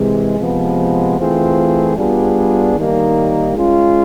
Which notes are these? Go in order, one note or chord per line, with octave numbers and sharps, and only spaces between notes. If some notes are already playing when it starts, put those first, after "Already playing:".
Already playing: C3 E3 G#3
C3 F3 G#3 B3
E3 A3 C4 F4 G#4
G3 B3 D4 F4 G#4
D#3 G3 A#3 D#4
G#3 C#4 F4